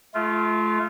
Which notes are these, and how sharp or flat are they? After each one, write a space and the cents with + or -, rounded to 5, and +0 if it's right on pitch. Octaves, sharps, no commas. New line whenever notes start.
A3 -35 F4 -15